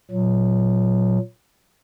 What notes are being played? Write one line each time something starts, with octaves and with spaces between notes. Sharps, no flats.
A#2 F#3